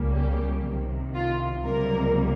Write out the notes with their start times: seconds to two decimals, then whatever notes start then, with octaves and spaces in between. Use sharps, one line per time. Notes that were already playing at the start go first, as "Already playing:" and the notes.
Already playing: C#2 C#3 G3 A#3
0.15 G4
0.64 C2 C3 D#3
1.14 F4
1.64 C#2 C3 G3 A#3 A#4